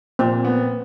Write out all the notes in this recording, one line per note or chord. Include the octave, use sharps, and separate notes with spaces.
A#2 C4
B3